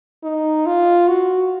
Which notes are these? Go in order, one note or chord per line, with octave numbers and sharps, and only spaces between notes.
D#4
F4
F#4